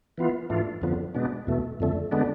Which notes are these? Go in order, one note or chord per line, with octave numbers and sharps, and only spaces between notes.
E3 B3 F4
G#2 E3 A3 D4 F4
F2 D3 F3 B3
B2 G#3 B3 D4
E2 B2 A3
F2 D3 A3
D3 G#3 B3 D4